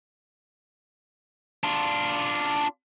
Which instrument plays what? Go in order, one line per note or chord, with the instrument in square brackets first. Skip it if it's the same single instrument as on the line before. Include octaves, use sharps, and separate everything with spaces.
[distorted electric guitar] D4 F4